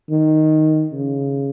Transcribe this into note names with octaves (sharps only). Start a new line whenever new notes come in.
D#3
C#3